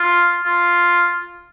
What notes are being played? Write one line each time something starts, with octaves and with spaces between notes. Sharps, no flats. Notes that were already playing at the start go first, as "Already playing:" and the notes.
Already playing: F4
F4